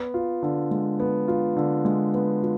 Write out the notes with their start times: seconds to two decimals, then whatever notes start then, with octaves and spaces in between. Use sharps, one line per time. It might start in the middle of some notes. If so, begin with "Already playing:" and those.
Already playing: B3
0.14 F4
0.42 D3
0.71 G#3
1.00 B3
1.28 F4
1.56 D3
1.85 G#3
2.14 B3
2.42 F4